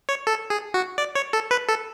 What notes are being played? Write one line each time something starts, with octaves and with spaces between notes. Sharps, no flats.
C#5
A4
G#4
F#4
D5
C#5
A4
B4
A4